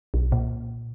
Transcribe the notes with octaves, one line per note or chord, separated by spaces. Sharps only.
B1
A#2